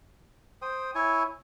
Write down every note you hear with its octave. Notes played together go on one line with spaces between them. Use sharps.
C5 G5 D#6
E4 C#5 G#5